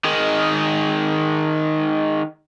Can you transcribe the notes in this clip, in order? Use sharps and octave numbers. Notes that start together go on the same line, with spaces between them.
D#3 G#3